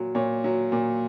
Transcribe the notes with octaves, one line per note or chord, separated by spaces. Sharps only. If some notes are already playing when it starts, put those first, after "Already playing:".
Already playing: A#2 F#3
A#2 C#5
F#3
A#2